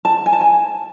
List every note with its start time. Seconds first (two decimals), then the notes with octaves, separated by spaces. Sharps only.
0.05 A5
0.26 G#5
0.33 A5
0.41 G#5